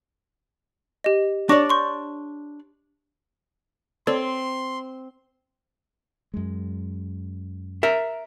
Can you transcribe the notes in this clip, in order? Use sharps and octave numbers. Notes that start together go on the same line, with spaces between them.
G4 D#5
D4 C#5 D5 C#6 D6 A#6
C6 C#6 G6
C4 A4 C#5 D5 C6
F#2 G#3
A#4 E5